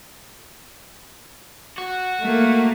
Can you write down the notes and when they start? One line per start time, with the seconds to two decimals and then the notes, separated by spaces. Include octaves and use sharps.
1.78 F#4
2.21 A3 A#3